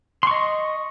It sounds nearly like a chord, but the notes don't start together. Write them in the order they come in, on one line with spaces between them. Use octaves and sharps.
C6 C#6 D#5